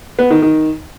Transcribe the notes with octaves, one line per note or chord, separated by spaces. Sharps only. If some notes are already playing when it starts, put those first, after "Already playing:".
B3
D#3
D#3